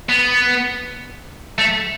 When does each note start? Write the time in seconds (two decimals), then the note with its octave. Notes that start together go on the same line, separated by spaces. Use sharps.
0.09 B3
1.58 A3